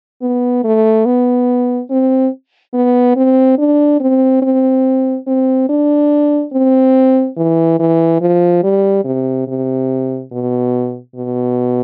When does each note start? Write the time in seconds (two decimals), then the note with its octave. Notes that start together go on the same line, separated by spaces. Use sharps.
0.22 B3
0.64 A3
1.06 B3
1.90 C4
2.74 B3
3.16 C4
3.58 D4
4.00 C4
4.42 C4
5.27 C4
5.69 D4
6.53 C4
7.37 E3
7.79 E3
8.21 F3
8.63 G3
9.05 C3
9.48 C3
10.32 B2
11.16 B2